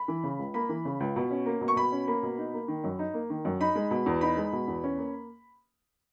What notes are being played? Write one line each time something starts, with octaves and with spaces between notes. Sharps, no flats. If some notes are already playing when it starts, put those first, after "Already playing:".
Already playing: B5
E3
C#3
C#2
A#3 B5
E3
C#3
C#2
B2
C#4
A#3
B2
C#6
B2 B5
C#4
A#3 B5
B2
D#4
A#3
D#3
F#2
D#4
A#3
D#3
F#2
D#4 B5
G#3
B2
E2
D#4 B5
G#3
B2
E2
C#4
A#3